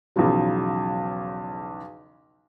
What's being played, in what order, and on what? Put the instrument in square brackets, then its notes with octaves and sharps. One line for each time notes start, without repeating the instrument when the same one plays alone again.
[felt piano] B1 E2 C#3 F3 F#3